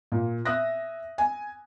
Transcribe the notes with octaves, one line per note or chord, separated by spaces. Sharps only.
A#2
E5 D#6 F#6 A#6
G#5